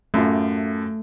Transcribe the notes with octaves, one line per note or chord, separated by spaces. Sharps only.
F#2 A2 A3 F4